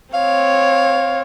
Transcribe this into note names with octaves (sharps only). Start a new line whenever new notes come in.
C4 C#5 F5